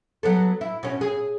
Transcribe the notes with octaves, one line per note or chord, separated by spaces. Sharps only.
F#3 B3 A4
E4
B2 C#4
G#4